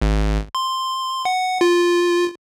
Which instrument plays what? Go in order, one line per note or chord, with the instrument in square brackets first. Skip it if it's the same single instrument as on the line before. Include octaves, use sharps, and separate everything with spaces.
[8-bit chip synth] G#1
C6
F#5
F4